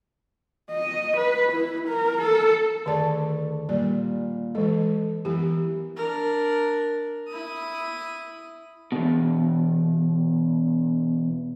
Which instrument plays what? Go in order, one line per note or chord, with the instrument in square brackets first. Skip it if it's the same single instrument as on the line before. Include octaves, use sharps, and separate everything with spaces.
[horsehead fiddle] D#5
B4
E4
A#4
A4
[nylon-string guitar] D2 G#4 D5 [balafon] D#3 A5
[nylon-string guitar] A#2 G3 [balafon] D5
[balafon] E3 G#3 [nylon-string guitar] A4
[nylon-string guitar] E3 B3 A#4 [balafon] G4
[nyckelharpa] D4 A#4
E4 D#6
[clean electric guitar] E2 B2